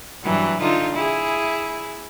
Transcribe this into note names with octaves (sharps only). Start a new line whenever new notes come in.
G2 E3 F#3
D3 D#4 F4
E4 G#4